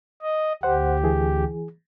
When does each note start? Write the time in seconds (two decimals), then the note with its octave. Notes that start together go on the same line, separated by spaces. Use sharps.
0.23 D#5
0.63 D2 G4 C5 F#5
1.03 E3 G#4